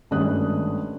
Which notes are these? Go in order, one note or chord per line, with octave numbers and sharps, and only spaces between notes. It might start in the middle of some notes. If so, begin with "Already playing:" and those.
G#1 G2 A3 C#4 D#6 F#6